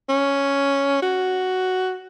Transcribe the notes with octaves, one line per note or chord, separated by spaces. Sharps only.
C#4
F#4